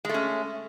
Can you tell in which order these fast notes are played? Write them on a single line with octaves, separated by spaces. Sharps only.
G#3 A3 C#4